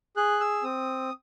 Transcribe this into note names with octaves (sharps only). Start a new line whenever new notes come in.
G#4 F#6
E6
C4 D#6